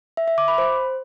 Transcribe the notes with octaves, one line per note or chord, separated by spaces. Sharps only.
E5
E5
D6
B5
C5